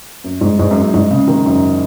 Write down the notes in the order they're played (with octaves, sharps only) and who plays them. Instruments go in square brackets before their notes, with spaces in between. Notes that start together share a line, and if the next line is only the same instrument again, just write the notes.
[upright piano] F#2
G#2
G#2
F#2
F#2
G#2
C#3
D#3
F#2